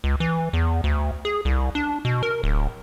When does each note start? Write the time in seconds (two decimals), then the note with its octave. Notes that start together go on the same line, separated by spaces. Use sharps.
0.04 C#2
0.20 E3
0.53 E2
0.84 D2
1.25 G#4
1.45 C2
1.75 D4
2.05 B2
2.23 A#4
2.43 D1